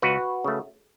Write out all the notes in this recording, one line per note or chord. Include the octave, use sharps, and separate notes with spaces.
C#2 F#4 B4
C#3 A3